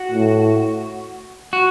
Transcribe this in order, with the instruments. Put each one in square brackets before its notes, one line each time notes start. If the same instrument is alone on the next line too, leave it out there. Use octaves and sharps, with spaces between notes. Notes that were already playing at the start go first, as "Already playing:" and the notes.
Already playing: [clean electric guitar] F#4
[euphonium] A2
[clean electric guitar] F#4